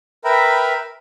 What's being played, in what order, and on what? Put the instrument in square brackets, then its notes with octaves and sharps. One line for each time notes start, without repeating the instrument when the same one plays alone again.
[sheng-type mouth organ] A#4 B4 E5 G5 A#5 B5